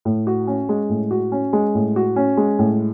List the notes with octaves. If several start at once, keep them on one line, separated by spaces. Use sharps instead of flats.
A2
F#4
C#4
G#3
A2
F#4
C#4
G#3
A2
F#4
C#4
G#3
A2